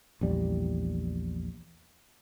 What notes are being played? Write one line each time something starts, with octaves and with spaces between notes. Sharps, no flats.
A#1 E2 G3